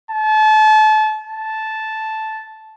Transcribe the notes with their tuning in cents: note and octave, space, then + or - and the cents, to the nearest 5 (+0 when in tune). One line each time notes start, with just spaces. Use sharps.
A5 -30
A5 -5